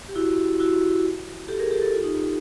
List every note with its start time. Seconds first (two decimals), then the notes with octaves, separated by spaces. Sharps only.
0.09 G4
0.16 E4 F#4
0.60 E4 F#4
1.48 G4 A4
1.60 G#4 A#4
1.71 G4 A4
1.82 G4 A4
1.93 F4 G4
2.04 D#4